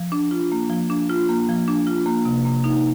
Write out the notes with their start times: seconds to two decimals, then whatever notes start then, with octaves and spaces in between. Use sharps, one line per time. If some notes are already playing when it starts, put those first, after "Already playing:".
Already playing: F3
0.12 D4
0.31 F4
0.52 A#3
0.70 F3
0.90 D4
1.09 F4
1.29 A#3
1.48 F3
1.68 D4
1.87 F4
2.06 A#3
2.25 C3
2.45 A#3
2.64 D#4